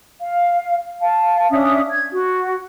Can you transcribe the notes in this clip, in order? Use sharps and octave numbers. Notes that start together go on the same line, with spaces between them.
F5
F5 A5
C#4 D4 E5 D#6
G#6
F#4